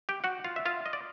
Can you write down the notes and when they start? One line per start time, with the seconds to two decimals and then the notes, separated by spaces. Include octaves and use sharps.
0.09 G4 G5
0.24 F#4 F#5
0.44 F4 F5
0.56 E5
0.66 F4 F5
0.86 D#5
0.93 D5